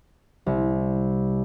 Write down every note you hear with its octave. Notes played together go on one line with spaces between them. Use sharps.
C2